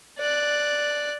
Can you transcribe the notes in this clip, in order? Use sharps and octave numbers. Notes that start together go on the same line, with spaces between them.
D5 F#6